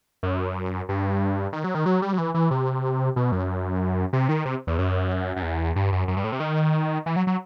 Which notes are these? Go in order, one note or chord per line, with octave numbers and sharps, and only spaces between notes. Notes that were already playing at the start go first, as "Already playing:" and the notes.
F#2
G2
D#3
F#3
D#3
F#3
G3
F#3
E3
E3
C3
B2
F#2
C3
D#3
C3
E2
F#2
F#2
E2
G2
F#2
F#2
G2
A2
C3
D#3
E3
F#3
F#3